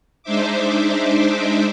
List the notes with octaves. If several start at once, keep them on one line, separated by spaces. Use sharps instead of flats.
G#3 D4 D#4 C5 E5 D6